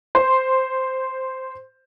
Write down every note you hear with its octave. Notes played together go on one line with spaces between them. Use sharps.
C5 C6